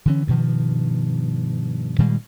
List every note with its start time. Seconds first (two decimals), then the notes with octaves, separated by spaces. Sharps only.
0.06 D3 E3 C#4
0.27 G2 B2 D#3 F3
1.98 A#2 D#3 G3 G#3